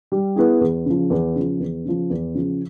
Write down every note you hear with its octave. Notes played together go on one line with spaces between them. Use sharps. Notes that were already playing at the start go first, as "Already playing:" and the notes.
G3
B3 E4 G#4
E2
C#3 F3
E2
C#3 F3
E2
C#3 F3
E2
C#3 F3